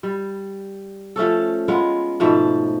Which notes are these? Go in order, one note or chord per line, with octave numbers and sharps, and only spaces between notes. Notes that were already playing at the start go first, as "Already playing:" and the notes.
G3
F3 A3 C#4 A4
G#3 B3 F4
G#2 B2 F3 A3